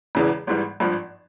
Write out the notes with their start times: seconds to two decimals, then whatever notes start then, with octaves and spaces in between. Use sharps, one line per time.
0.15 E1 E2 C#3 E3
0.47 G#1 G#2 E3 G3
0.80 G#1 G2 F3